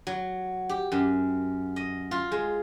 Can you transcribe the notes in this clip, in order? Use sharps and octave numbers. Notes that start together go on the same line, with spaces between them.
F#3
G4
F#2
D#5
F4
G#3